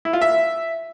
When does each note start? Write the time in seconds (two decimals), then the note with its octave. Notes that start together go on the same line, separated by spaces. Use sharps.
0.05 E4
0.13 F4
0.21 E5